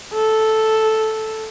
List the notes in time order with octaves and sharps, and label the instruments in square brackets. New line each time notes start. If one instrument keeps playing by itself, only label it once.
[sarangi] A4